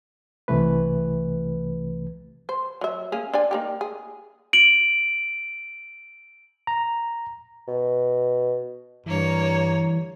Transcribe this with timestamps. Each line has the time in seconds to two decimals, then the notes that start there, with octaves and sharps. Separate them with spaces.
0.48 C2 C3 E3 A3 B4
2.49 C5
2.81 F#3 E5
3.12 A#3 C#4 G#4
3.34 D4 D5 G#5
3.51 A#3 D#4 G4
3.81 G#4
4.53 D7 F#7
6.67 A#5
7.68 B2
9.06 G2 E3 A#3 C#5